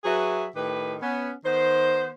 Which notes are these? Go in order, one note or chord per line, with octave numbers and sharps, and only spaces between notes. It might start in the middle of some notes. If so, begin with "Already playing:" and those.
F#3 F#4 G#4 B4 E5
A2 D#3 G4 B4
B3 C#4
D#3 B3 C5